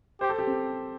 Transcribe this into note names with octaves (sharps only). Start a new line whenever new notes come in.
G4 C5
A4
G4
C4